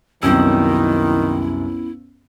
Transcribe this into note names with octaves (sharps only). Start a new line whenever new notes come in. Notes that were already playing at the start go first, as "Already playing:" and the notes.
C2 F#2 D#3 B3 C#4 E4 E6